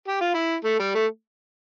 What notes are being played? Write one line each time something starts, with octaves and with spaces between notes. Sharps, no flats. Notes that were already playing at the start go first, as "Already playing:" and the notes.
G4
F4
E4
A3
G3
A3